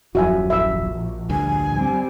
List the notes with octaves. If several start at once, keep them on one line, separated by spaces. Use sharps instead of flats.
D#1 F#2 F3 G3 F#4 E5 G#5
A#1 E5 E6
D2 G2 G#5
G3 C4